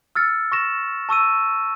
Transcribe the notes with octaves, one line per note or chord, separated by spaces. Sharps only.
E6 F6 A6 C#7
C#6 A#6 E7
A5 C#6 E6 D#7